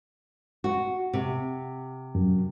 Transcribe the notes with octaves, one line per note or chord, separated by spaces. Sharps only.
F#4
C3
F#2